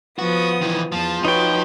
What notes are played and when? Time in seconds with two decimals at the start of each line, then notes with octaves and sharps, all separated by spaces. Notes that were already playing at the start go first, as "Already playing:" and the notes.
0.19 F3 B3 F#4 D#6
0.62 D#3 E3
0.92 E2 F3 A5
1.25 D#4 F#4 B4 C#5 G5